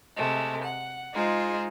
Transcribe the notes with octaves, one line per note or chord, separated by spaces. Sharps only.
C3 G#3 A3
F#5
G#3 D#4 F4 G#4 C5